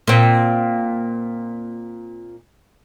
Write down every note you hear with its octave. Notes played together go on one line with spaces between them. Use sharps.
A#2 C4